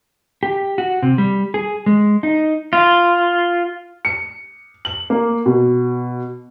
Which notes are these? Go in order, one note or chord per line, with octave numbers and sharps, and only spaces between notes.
G4
F#4
C3
G3
G#4
G#3
D#4
F4
C#7
F#7
A#3
B2